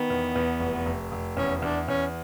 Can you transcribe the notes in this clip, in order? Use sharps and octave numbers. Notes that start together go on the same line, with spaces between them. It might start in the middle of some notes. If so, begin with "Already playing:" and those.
Already playing: D#3 B3
E2
E2
F1
F1
F1
E2 C#4
E2 D4
E2 C#4